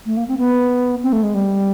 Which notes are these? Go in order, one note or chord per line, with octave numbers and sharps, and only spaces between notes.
A3
A#3
C4
B3
C4
A3
G#3
G3